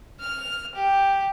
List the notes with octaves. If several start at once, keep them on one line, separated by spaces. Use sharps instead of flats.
F6
G4